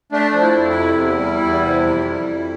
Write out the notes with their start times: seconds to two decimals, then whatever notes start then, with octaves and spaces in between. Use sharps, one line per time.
0.12 A3 D4
0.33 F3
0.41 E4
0.56 F2
0.69 E4
0.77 C3
0.98 E2
1.19 G3
1.41 E2
1.61 C3
1.83 F2
2.05 G3
2.26 F2